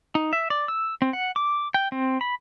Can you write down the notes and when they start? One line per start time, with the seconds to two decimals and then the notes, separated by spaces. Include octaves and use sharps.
0.15 D#4
0.33 E5
0.50 D5
0.68 E6
1.02 C4
1.13 F#5
1.36 D6
1.74 G5
1.92 C4
2.21 B5